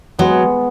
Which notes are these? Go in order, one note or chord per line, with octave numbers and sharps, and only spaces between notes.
F#3 G#3 B3